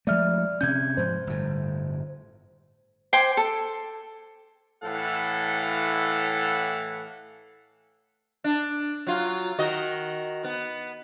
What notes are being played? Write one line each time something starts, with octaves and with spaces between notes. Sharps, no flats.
F3 G#3 A3 D5 E5 F6
C3 C#4 G6 G#6
G#2 F3 C5
G1 A2
C5 G5 G#5 D6
A4
A2 E3 A4 F5 F#5
D4
F#3 F4
D#3 F#4 D#5
B3